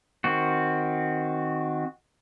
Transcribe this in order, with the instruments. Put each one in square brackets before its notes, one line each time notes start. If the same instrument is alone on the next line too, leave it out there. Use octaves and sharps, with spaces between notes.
[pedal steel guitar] D#3 C4 F#4